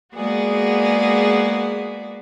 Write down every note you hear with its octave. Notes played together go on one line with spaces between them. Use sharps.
G#3 A#3 B3 F#4 G#4 D5